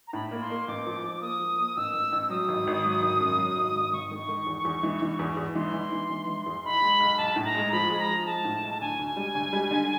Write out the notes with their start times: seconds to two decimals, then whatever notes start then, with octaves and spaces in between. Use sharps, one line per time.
0.08 A#5
0.13 A2 B5
0.31 A#3
0.41 C6
0.50 A#3
0.68 A1 D6
0.86 F3
1.04 F3
1.17 D6
1.21 A#3 D#6
1.39 F3
1.59 A#3
1.76 A1 E6
1.94 A1
2.12 A1
2.23 E6
2.30 F#3 D#6
2.48 G#1
2.67 G#1
2.84 F#3
3.02 G#1
3.20 F#2
3.38 F#3
3.56 G#1
3.75 G#1
3.93 G#1 C#6
4.11 D#3
4.29 D#3
4.47 E2
4.65 E2
4.83 E3
5.02 E3
5.19 E2
5.37 E2
5.55 E3 C6
5.74 E3
5.92 E3
6.10 E3
6.27 E3
6.46 E2
6.64 B1 B5
6.82 G#3
7.00 B1
7.18 B1 A5
7.36 A2
7.45 A#5
7.55 G#3
7.72 F3 B5
7.90 G#3 B5
7.99 A#5
8.09 F3
8.26 G#3 A5
8.45 A2
8.63 B1
8.69 A5
8.81 D2 G#5
8.99 D2
9.17 G3
9.35 D2
9.53 G3
9.71 D3